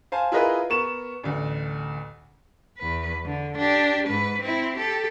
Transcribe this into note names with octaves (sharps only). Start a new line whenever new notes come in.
C5 F5 G#5 A5
E4 F4 G#4 A#4 B4 D#5
B3 A#4 C#6 E7
A1 D2
E2 B4
D3
D4 G4
G#2 B4
C4 E4
G4 A4